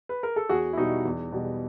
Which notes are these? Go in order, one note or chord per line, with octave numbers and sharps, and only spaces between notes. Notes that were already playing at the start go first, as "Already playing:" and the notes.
B4
A#4
A4
E2 F#4 G#4
E4
B2 G3 D#4
E2
B2 G3